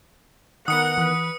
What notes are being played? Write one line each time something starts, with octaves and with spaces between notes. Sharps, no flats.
D#3 B3 A#4 F#5 D#6 C#7
E3 B4